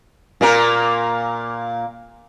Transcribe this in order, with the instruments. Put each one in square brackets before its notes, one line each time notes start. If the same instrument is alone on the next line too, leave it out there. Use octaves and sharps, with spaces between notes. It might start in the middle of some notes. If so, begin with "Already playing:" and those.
[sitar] A#2 A#3 A#4